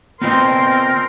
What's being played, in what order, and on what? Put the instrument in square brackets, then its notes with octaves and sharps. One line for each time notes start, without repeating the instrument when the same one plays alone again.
[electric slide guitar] B3 F4 D#5 [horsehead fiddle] C4 [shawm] A#4 [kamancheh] C6